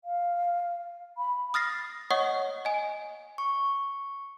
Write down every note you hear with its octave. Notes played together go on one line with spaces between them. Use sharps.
F5
B5
D#6 F6 A6 A#6 C7
C#5 D#5 F#5 C#6 D#6
D#5 G#5
C#6